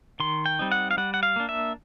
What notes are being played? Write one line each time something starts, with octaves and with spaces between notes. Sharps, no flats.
D#3 C6
G5
G3 C4 D#4
F#5
F5
G3 F#5
F#5
F5
A#3 D4
E5